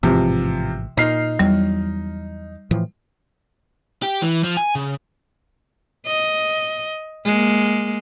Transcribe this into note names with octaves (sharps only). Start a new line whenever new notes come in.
A1 G#2 C3 E3 F3
A#2 D#4 F6 C7
E2 F#3 G3
A2 E3 F3
G4
E3
F3
G#5
C#3
D#5
G#3 A#3